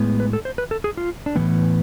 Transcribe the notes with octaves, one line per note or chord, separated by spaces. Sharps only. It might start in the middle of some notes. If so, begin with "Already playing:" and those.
Already playing: A2 G#3 B3
B4
A4
C5
B4
A4
G#4
F4
D4
A2 E3 B3 C4